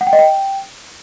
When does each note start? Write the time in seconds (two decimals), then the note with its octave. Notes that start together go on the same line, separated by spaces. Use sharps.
0.01 F#5
0.07 G5
0.13 D#5
0.19 G5